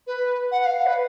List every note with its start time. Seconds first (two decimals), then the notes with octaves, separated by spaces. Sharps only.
0.07 B4
0.52 F#5
0.66 F5
0.87 B4